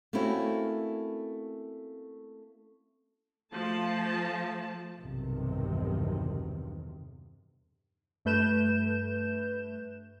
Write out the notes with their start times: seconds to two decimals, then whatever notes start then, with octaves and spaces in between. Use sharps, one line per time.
0.13 A3 A#3 C4 C#4 E4 F#4
3.53 F3 A3 A5
4.99 B1 E2 G2 C3 D#3
8.25 G2 A3 B4 G6 E7